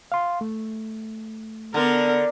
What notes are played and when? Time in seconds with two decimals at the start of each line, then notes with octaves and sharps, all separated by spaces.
0.12 F5 C6
0.41 A3
1.74 D3 B3 A#4